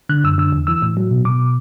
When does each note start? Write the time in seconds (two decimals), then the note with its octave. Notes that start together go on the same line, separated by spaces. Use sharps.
0.09 D3 F#6
0.24 F#2 E6
0.38 D3 E6
0.52 E2
0.67 E3 E6
0.82 A2
0.97 F#3
1.11 B2
1.25 B2 D6